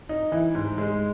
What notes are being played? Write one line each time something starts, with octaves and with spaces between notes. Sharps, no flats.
D#4
E3
G#2
G#3